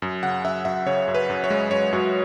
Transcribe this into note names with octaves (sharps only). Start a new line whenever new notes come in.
F#2
C#3 F#5
F#2 E5
F#2 E5
C#3 C#5
F#2
B4
F#2
C#5
G#3
F#2 C#5
F#2 F#4